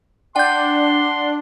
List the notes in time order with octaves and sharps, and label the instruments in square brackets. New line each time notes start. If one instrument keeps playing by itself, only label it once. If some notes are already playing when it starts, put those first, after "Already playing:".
[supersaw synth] D4 [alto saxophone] F#5 [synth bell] G5 G6 [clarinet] C6